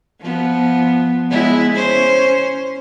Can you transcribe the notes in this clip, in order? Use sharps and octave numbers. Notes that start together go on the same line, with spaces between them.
F3 B3
G#3 B3 E4
C#4 C5